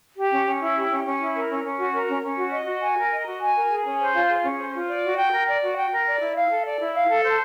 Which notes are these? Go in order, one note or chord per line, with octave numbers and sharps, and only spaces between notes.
G4
C#4
C#4
E4
G4
C#4
C#4
E4
A#4
C#4
C#4
F#4
A#4
C#4
C#4
F#4
D#5
F#4
G#5
A#4
D#5
F#4
G#5
A#4
G#4
C#4
C5
F4
G#4
C#4
C5
F4
D5
F#4
G5
A#4
D5
F#4
G5
A#4
D5
E4
F5
A4
D5
E4
F5
A4
C5